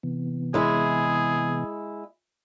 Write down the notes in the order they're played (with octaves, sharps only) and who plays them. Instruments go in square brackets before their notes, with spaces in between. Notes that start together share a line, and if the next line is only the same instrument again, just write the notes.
[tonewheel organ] C3 E3 B3
[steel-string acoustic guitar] G#3 E4 [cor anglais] G#4